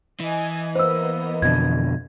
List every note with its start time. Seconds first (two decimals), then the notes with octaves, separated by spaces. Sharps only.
0.20 E3 D#5 G#5
0.75 A#3 B3 C5 D#5 E6
1.42 F2 B2 D3 G#6